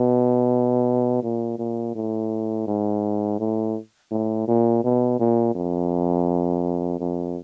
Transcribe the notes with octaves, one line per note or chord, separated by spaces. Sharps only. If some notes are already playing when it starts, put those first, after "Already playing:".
Already playing: B2
A#2
A#2
A2
G#2
A2
A2
A#2
B2
A#2
F2
F2